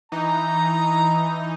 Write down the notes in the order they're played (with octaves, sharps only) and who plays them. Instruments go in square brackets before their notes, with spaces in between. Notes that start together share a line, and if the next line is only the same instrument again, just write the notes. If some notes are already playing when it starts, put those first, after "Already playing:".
[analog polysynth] E3 D#4 [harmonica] A#5